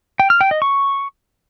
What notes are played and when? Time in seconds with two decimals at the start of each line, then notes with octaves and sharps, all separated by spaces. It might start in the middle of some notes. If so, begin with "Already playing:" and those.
0.20 G5
0.30 F6
0.41 G5
0.51 D#5
0.62 C#6